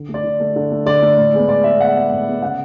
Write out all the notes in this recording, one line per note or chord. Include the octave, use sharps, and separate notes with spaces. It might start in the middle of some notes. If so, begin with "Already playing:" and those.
Already playing: D3
A3
D5
D3
A3
D3
A3
D3 D5
A3
A2
G#3 B3
A2 D5
G#3 B3 E5
A2 F#5
G#3 B3
A2
G#3 B3
C#3 F#5